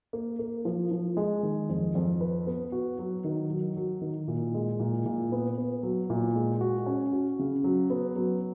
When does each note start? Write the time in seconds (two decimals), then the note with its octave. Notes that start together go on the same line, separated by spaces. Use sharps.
0.13 A#3
0.39 A#3
0.65 F3
0.91 F3
1.17 G#3
1.43 D#3
1.69 F2
1.95 F2
2.21 B4
2.47 B3
2.72 F#4
2.99 F#3
3.24 D#3
3.50 F#3
3.76 F#3
4.01 D#3
4.28 A#2
4.54 G#3
4.79 A#2
5.06 A#2
5.32 B3
5.58 B3
5.83 F#3
6.10 A#2
6.35 G#3
6.61 F#4
6.86 C#4
7.13 F#4
7.39 C#3
7.64 F#3
7.90 B3
8.16 F#3